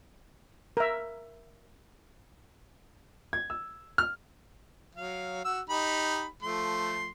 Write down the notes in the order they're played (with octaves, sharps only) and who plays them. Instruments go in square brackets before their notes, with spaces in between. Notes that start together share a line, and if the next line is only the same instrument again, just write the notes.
[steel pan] A#4 E5
[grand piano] G#6
E6
F6
[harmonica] F#3 F5
F#4 E6
D#4 G4 B5
F3 A3 C6